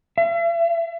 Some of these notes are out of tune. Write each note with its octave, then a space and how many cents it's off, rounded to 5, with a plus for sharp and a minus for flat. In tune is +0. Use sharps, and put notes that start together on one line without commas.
E5 +40